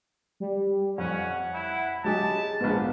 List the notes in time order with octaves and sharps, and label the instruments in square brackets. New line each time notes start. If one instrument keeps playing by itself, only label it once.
[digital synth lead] G3
[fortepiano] F2 [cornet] C#4 [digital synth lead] F#5
[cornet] E4
[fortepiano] F#3 G4 G#4 [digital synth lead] G#3 [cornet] A5
[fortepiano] A#1 G#2 [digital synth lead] B3